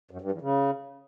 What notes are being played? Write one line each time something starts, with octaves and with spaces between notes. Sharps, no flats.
F#2
G2
E2
C#3